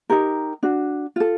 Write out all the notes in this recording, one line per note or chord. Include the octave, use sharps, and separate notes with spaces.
D#4 G4 A#4
D4 F#4
F4 A4